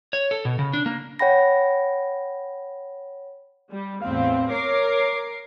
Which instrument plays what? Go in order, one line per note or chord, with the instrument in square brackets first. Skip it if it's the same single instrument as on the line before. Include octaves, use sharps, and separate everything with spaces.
[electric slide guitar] C#5
A4
B2
C#3
D4
A#3
[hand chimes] C#5 F#5 G5 B5 A#6
[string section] G3
[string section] E2 A2 C4 [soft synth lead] F5
[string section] A#4 D6 C7 [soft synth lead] C#5